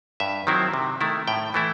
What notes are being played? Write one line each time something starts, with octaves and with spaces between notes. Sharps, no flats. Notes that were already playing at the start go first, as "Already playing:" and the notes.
G2 E5
D#3 F#3 C4 E4
C3
D#3 A3 E4
A2 G5
E3 A3 E4